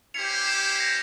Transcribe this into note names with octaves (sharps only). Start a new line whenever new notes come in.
C#4 E4 G4 C5 C#7 F7
C7 E7
A#6 C#7